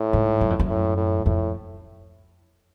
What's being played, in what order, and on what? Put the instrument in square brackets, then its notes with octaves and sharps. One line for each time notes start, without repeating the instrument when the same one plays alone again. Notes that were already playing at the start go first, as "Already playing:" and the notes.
Already playing: [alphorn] A2
[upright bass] G#2
F#2
F2
F#2
[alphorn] A2
A2
[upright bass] F2 [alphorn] A2